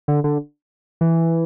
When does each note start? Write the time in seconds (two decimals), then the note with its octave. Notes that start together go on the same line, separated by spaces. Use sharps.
0.08 D3
0.24 D3
1.01 E3